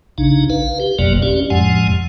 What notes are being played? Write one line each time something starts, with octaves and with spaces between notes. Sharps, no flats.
A#1 C#3 D4 D#4
B4 F5
G4
G1 F2 B2 F#3 A#3 D5
C#4 G4 D5
F2 A2 F3 G#3 F#5 G#5